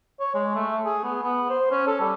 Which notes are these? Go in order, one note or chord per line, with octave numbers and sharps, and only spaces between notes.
C#5
G#3
A3
G#4
B3
B3
C5
C#4
A4
G3